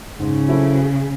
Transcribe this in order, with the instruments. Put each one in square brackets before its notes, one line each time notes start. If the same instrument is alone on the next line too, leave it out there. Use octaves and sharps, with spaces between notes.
[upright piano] G#2 [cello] C#3
[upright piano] F#3 C4 E4 A4